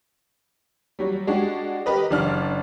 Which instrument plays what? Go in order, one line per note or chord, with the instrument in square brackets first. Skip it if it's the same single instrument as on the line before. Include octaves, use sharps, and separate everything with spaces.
[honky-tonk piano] F#3 G3
G#3 D4 F#4 G4
G4 A#4 B4 D#5
F#1 D4 F6